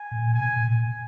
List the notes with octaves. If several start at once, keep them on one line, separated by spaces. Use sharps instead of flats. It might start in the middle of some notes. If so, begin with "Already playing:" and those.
Already playing: G#5
A#2
B2 G#5
A#2